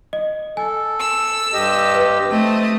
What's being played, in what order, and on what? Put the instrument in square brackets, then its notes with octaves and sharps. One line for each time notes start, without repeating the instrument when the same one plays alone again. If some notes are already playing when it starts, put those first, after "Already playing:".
[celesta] D#5
[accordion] A4 [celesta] G#5
[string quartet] E6
[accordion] G2 G4 D#5
[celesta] B4
[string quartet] A3 D#5 [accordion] C4